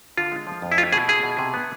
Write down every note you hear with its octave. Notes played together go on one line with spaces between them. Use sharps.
D3 F4
G#3
F3
F2
E4
A3 F4
B2 G#4
E4 G#4
B2
C3
B3